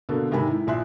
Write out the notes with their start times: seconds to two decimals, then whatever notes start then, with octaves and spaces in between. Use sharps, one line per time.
0.09 B2 D3 A#3 A4
0.31 G#2 C3 D#3 G#5 B5
0.47 E4
0.67 A#1 E5 C6 F#6